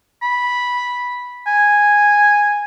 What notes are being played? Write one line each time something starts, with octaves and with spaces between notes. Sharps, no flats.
B5
G#5